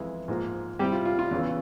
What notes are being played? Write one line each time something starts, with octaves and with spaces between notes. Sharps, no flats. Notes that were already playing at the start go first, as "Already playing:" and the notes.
Already playing: F2 E3 G#3 E4
G#2 F3 A#3
C3 G3 C4 E4 G4
F4
F4
F4
E2 C#3 E3